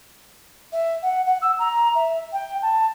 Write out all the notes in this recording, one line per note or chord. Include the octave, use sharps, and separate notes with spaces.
E5
F#5
F#5
E6
A#5
E5
G5
A5